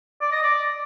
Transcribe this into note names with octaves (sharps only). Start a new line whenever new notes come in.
D5
D#5
D5